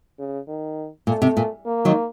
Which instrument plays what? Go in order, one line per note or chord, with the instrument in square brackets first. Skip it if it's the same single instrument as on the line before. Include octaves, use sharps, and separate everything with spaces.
[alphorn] C#3
D#3
[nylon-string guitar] A#2 [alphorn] A3
[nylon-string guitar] C3
A#2
[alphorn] A#3
[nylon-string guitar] D#3 F#3